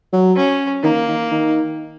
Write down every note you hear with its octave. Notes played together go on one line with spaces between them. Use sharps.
F#3
C#4
D#3 A#3
D#3
D#3